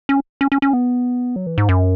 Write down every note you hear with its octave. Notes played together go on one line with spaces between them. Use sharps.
C#4
C#4
C#4
C#4
B3
F#3
E3
G#2
F#2